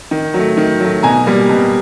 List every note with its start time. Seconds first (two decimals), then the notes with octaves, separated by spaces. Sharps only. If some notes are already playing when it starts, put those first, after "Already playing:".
0.11 D#3
0.34 F#3 A3
0.57 D#3
0.80 F#3 A3
1.03 B2 G#5 A#5
1.26 G3 A#3
1.49 B2